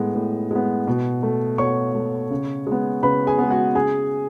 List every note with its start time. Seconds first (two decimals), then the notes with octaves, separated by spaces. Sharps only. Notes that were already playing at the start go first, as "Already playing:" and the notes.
Already playing: A2 G#3 B3 A4
0.15 A2
0.51 G#3 B3
0.87 B2
1.23 A3
1.58 B2 C#5 C#6
1.95 A3
2.30 C#3
2.67 G#3 B3
3.03 C#3 B4 B5
3.27 G#4 G#5
3.38 G#3 B3
3.50 F#4 F#5
3.75 C#3 G#4 G#5